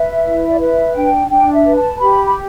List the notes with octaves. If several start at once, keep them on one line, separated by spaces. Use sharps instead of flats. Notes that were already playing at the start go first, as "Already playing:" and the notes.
Already playing: B4 E5
E4
D5
B4 E5
D4 G5
D4 G5
E5
B4
A5
G4 B5
B5